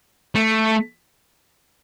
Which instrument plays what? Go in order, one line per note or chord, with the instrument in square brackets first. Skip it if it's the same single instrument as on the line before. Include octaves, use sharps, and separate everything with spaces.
[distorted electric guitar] A3